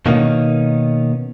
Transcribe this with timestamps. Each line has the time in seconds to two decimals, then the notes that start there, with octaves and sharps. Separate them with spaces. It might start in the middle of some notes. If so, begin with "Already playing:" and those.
0.06 B2 D#3 A#3 B3 C#4 D#4